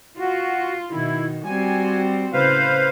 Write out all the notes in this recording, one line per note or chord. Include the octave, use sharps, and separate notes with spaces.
F4 F#4
B2 D#3 E4
G3 C4 F#4 G#5
A2 C#3 B4 C5 F5